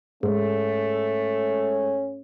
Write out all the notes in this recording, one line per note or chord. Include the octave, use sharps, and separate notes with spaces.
G#2 A3 C#4